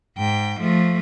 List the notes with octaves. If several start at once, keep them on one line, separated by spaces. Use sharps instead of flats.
G#2 G5
F3 A3